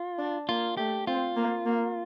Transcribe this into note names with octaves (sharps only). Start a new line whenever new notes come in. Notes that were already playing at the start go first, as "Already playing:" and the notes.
Already playing: F4
D4
A#3 F4
A3 G4
C4 F4
A#3
A#3